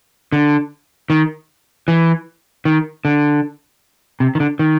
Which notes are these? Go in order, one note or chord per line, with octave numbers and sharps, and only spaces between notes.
D3
D#3
E3
D#3
D3
C3
D#3
D3
D#3